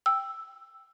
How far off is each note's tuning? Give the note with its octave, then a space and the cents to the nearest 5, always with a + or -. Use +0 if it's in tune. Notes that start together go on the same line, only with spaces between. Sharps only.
G5 +0 E6 +0